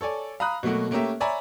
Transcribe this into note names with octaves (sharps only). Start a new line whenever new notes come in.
A4 C#5 D5 G#5
F5 A#5 B5 D#6 F#6
B2 F#3 A3 A#3 F#4
A3 A#3 C#4 G4 A#4 E5
C#5 D5 E5 G#5 A#5 B5